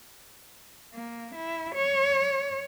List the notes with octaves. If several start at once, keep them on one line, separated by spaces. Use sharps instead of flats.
A#3
E4
C#5